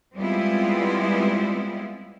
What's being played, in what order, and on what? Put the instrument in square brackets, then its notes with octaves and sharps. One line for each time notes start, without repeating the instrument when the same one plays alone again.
[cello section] G3 G#3 B3 C4 E4 F4